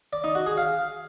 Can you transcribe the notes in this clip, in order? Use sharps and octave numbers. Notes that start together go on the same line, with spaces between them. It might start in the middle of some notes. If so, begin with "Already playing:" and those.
D5
D#4
F#4
G#4
F5